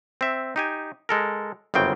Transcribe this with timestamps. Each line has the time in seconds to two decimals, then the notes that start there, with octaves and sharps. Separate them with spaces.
0.21 C4 E5
0.56 D#4 G4 G#5
1.09 G#3 A4 A#4
1.74 G1 F#2 C#3 C4 G5